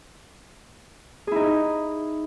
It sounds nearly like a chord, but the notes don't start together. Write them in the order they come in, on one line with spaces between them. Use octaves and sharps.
G#4 E4 D#4